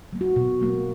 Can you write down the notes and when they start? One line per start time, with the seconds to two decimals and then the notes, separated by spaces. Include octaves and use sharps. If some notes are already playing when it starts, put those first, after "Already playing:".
0.13 F#3 A#3
0.21 F#4
0.36 B2
0.61 F#3 A#3